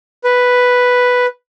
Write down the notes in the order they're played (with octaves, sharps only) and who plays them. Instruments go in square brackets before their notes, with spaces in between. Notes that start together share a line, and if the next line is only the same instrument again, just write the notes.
[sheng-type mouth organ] B4